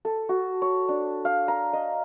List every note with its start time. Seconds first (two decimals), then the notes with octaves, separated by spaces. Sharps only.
0.05 A4
0.29 F#4
0.62 C#5
0.88 D4
1.25 F5
1.48 A#5
1.73 D#5